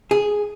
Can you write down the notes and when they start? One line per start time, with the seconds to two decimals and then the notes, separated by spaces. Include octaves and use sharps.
0.11 G#4